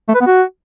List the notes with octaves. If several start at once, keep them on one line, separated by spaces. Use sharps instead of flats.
A3
B4
B3
F#4